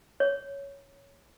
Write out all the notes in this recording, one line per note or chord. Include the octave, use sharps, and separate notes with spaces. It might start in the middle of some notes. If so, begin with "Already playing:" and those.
C#5